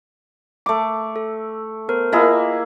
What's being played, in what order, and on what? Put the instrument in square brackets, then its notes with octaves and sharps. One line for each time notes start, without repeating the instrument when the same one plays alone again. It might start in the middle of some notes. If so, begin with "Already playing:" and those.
[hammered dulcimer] A3 D6
[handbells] A4
B3 A#4 C5
[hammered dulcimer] A#3 E4 G#4 [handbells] F4 D#5